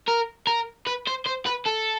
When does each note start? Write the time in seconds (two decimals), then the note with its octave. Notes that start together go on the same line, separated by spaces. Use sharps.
0.08 A#4
0.47 A#4
0.87 B4
1.07 C5
1.26 C5
1.46 B4
1.66 A4